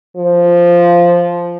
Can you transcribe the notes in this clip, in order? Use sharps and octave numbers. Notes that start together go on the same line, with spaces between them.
F3